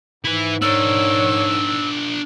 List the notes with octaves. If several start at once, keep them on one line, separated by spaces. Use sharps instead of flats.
G#2 E4 B4
D4 A#4 C#5 E6